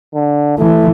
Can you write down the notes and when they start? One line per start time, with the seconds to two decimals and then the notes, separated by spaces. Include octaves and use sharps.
0.15 D3
0.59 E3 A3